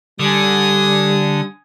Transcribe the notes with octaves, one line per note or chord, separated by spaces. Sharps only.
D3 G3 G#5 D#6